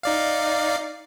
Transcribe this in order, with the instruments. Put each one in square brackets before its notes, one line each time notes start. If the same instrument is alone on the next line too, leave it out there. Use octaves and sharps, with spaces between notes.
[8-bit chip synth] D#4 D5 F5